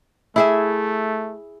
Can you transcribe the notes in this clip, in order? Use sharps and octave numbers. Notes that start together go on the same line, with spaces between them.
A3 E4 G#4 E5